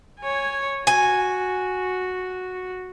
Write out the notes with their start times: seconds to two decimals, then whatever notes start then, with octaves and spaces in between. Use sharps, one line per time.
0.21 C#5 G#5
0.87 F#4 G#5